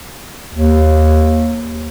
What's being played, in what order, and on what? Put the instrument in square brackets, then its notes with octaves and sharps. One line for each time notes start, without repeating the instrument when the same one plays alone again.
[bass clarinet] D#2